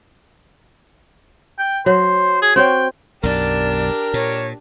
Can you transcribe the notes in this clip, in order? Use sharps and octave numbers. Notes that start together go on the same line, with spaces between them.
G5
F#3 C5
G#4
C4 F#4 C#5 G5
B1 F#2 D4 G4 A#4 D5
A#2 C#5